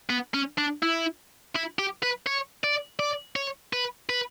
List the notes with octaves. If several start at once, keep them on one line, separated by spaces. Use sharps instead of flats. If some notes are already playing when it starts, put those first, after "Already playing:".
B3
C#4
D4
E4
E4
G4
B4
C#5
D5
D5
C#5
B4
B4